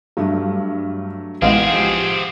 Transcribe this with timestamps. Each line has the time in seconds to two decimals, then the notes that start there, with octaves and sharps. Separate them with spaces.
0.17 G2 F#3 A3 D4
1.42 A1 G#3 B3 C4 E4 G#4 F5 F#5
1.73 F3 G4